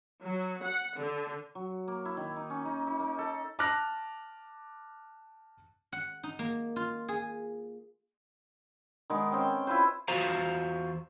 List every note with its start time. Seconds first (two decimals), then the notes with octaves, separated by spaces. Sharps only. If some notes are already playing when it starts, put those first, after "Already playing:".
0.23 F#3
0.64 F#5
1.00 D3
1.55 F#3
1.88 A#3
2.05 E4
2.17 D#3
2.36 D#4
2.50 C#4
2.65 D#4
2.87 D#4
3.00 A#3
3.18 A4
3.59 A5 D6 F6 F#6 A#6
5.92 F#5
6.23 D#4
6.39 A#3
6.76 F4
7.08 G#4
9.10 D#3 G#3 B3
9.31 C4 C#4 G5
9.67 E4 F4 B4 C5
10.08 E2 F4 F#4 C5 F5 A#5